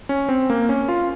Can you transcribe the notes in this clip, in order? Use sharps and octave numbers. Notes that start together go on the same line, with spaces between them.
C#4
C4
A#3
C#4
F4